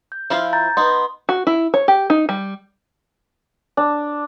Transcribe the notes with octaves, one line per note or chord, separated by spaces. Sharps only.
G6
F3 E4 F4
A#5 G6 A6
B3 D#4 C6
F#4
E4
C#5
G4
D#4
G3
D4